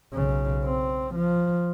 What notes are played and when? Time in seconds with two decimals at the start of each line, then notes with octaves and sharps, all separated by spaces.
0.13 B1 C#3
0.64 C4
1.15 F3